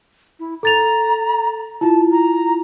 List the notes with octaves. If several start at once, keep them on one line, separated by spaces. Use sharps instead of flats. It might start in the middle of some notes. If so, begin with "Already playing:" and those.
E4
A4 A#5 A6 F7
E4 F4 A5
A#5